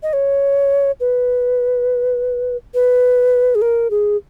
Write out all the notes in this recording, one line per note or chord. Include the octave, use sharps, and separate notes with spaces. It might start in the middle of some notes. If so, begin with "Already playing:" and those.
D#5
C#5
B4
B4
G#4
A#4
G#4